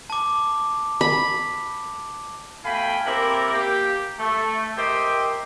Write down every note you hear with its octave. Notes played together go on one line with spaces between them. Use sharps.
A5 D6
B5
B2 A3 F5 G5 G#5 B5
A#3 C4 E4 G4 A4 A#4
A#3 G4
A3
G4 A#4 C5 D#5 E5 G5